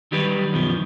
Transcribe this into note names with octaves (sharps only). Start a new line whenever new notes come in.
D#3 F#3 G3 D#4 G4 B4
F#2 B2 D#3 F3